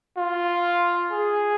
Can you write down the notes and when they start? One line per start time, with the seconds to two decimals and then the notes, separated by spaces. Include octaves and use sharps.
0.17 F4
1.12 G#4